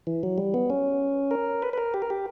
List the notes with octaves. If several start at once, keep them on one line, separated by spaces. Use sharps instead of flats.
E3
F#3
G3
B3
C#4
A#4
B4
B4
A#4
G4
A#4
G4